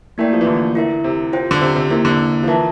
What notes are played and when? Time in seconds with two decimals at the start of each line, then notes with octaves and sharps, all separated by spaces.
0.18 A3 A#3 E4 A#4 D5 G5
0.33 F3
0.41 E3
0.47 D3
0.75 E4 A#4 E5
1.04 C3
1.33 F4 C5 G5
1.51 D3
1.61 C3
1.76 C3
1.90 C3 A#3 E4 A#4
2.05 D3
2.43 F3
2.48 E3 F4 A#4 E5 A5